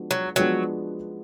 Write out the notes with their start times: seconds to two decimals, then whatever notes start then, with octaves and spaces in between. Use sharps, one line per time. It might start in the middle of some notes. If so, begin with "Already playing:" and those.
Already playing: F3 G#3 B3 D4 F#4
0.11 F#3
0.36 F3 F#3 G#3 B3 D4 F#4